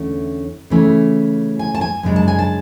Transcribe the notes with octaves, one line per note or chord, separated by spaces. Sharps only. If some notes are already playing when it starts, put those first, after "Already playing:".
Already playing: E2 D3 A3 C#4
C#3 E3 A3 C#4
G#5
A5
G#5
F#2 C#3 G#3 D4
A5
G#5
A5